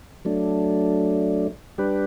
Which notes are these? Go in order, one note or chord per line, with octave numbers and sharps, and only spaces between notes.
F#3 A3 D4
G3 D4 G4 B4